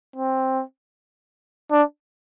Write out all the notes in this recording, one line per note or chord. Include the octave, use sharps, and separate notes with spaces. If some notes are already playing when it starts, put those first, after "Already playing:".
C4
D4